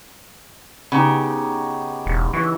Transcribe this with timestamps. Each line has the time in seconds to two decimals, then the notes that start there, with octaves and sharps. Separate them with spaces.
0.92 C#3 B3 D#4 G4
2.06 E1
2.33 E3 C#5 D#5 C#6